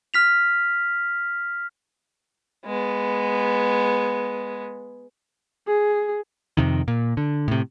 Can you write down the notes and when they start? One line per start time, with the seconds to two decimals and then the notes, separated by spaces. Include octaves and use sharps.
0.14 F6 B6 F7
2.66 G#3 B3
5.67 G#4
6.57 F2 C3 D#3
6.88 A#2
7.17 D3
7.48 A2 C3